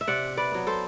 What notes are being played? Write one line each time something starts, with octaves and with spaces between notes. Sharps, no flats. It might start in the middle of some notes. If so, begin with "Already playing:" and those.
E5
C3 D5 F#5
B4 D5
F#3 B3
A4 C5